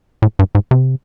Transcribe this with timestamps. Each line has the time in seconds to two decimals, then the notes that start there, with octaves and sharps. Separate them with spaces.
0.22 A2
0.39 G2
0.55 G#2
0.71 C3